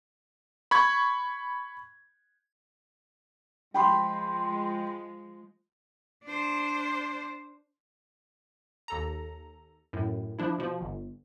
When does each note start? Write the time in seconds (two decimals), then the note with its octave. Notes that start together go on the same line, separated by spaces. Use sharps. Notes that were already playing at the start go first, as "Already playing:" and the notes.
0.71 B5 C#6 G#6
3.74 F3 G#3 G5 B5 C6
6.24 D4 C5
8.88 D#2 A4 A#5
9.93 F#2 A2
10.39 F3 D4 E4
10.58 B2 F3
10.81 G1